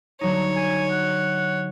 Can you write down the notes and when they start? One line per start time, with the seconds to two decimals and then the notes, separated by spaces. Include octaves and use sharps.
0.21 D3 F#3 D#4 C#5
0.56 G#5
0.91 F#5